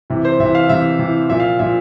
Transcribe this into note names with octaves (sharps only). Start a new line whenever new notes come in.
C3 E3
C5
C3 E3 E5
F5
C3 E3 E5
C3 E3
A#2 F3 E5
F5
A#2 F3 E5